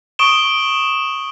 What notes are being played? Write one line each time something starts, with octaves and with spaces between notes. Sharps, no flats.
C#6 D#6 D7 E7 G7